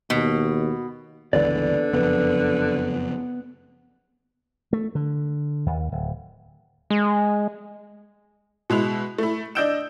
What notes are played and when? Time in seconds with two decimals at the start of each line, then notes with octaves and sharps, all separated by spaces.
0.10 D#2 B2
1.33 G1 C#2 D3 E3 B3 D5
1.93 F#1 F2 B3
4.73 A3
4.95 D3
5.66 D#2
5.92 D1
6.90 G#3
8.70 B2 G#3 E4 F7
9.18 A3 E4
9.55 D4 D#5 E6 G6 D7 E7